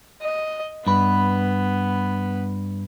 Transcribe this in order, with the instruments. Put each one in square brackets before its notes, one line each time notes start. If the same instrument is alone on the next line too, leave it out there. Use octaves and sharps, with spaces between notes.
[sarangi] D#5
[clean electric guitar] G2 B4 [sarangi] B3